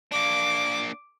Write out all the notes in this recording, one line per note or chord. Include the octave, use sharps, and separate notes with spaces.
A#3 D4 D6